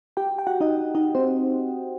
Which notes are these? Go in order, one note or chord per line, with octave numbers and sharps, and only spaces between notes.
G4 G5
G5
F#4 F#5
D#4 D#5
D#4 D#5
C4 C5